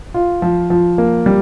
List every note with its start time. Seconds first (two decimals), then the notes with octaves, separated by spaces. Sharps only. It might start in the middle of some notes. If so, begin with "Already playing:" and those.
0.14 F4
0.42 F3
0.70 F3
0.98 A#3
1.26 G3